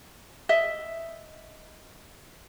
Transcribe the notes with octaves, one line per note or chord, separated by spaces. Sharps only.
D#5 E5